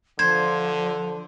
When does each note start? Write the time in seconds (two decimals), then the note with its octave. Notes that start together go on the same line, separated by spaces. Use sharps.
0.19 D3 F3 C5 G#6